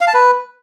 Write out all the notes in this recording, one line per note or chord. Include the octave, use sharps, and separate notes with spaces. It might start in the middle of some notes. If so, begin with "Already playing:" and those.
F5
A5
B4